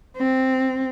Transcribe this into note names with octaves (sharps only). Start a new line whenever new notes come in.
C4